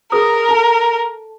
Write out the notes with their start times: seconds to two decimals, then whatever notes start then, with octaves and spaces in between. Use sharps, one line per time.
0.12 G#4 A#4 B4 D#6
0.49 A4 A5